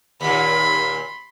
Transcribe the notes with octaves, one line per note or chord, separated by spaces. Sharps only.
D#2 A#2 B5 C6